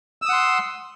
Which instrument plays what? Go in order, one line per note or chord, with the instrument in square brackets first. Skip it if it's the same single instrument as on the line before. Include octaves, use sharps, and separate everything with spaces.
[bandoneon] E6
D#6
F#5
C6